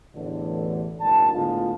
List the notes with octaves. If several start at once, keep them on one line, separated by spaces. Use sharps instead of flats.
A1 E2 D3 E3
F#1 G#2 D#3 D4 A5
A2 D3 G#3 B3 D#4 F4